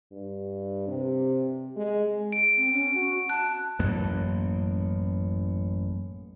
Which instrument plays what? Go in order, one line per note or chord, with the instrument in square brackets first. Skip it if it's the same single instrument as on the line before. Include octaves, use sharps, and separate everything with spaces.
[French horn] G2
C3
G#3
[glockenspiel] D7
[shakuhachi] C4
C#4
F#4
[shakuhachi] A5 [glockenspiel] F#6
[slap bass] A1 F#2 A2 A#3